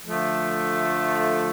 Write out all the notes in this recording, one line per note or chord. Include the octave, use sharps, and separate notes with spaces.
D3 F3 A3